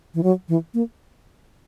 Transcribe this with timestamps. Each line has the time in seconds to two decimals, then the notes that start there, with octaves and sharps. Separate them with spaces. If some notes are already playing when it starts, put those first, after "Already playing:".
0.14 E3
0.23 F#3
0.49 E3
0.74 A#3